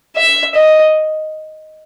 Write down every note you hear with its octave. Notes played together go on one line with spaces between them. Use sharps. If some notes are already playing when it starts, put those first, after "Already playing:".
E5
D#5